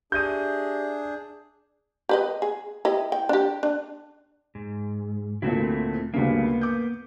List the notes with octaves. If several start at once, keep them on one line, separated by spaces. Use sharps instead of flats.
D4 G4 G#4 E5 D#6 G6 D#7
G4 B4 D#5
G#4
E4 G4 D#5
G5
D4 G4
D4
G#2
D2 A#2 A3 C4 E4
D2 G2 C#3 A#3 B3
D6 G6